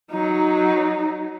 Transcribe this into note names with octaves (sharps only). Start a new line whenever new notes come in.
F#3 D#4